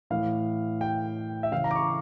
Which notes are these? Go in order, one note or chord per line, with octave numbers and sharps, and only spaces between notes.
A2 E3 F5
G5
E5
C#3 E3 F5
A#5
D6
C#6